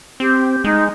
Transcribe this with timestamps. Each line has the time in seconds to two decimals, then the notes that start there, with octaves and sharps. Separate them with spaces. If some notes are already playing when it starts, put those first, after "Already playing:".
0.20 C4 G4
0.64 G#3 D#4